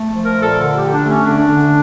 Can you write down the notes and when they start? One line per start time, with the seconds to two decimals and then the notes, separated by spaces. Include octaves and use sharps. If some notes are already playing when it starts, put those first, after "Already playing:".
Already playing: A3
0.13 F3
0.24 A#4
0.36 A#2
0.41 A4
0.58 D3
0.75 G4
0.81 D3
0.92 D4
1.03 A3
1.09 C#4
1.25 D3 D4
1.48 D3